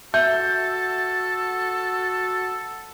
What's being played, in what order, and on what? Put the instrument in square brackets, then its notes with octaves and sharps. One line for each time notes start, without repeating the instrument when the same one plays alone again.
[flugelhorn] F#4 [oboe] A4 [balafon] E5 [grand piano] G6